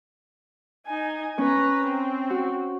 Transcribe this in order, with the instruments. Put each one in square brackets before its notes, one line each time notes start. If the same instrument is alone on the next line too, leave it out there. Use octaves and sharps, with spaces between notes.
[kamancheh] D#4 G#5
[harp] C#4 C#5 [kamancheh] B4 A#5
[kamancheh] C4
[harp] F#4